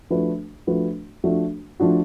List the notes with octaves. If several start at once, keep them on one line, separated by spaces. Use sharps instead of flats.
F3 A3 D4 F#4 B4
F3 A3 D4 F#4 B4
F3 A3 D4 F#4
F3 A3 D4 F#4